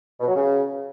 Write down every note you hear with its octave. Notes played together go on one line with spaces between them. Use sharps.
B2
F#3
C#3